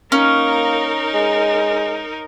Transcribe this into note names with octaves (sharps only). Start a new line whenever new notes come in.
A#3 C#4 D#4 A#4
G#3